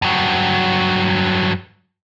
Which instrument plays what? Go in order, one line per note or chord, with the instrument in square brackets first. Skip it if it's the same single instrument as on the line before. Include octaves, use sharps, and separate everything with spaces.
[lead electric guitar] G2 F#3